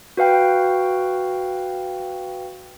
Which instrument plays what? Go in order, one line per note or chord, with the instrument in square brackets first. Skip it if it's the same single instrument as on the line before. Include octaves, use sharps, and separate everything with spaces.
[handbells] F#4 B4 F5 G5